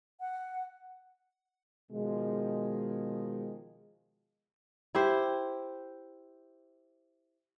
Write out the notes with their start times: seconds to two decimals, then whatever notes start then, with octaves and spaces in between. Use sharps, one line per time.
0.20 F#5
1.92 B2 D#3 F3 G#3
4.95 E4 G4 C5